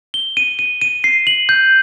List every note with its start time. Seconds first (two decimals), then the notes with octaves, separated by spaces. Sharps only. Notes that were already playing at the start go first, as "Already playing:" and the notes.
0.14 G7
0.37 D#7
0.59 D#7
0.82 D#7
1.04 C7
1.27 F#7
1.49 G6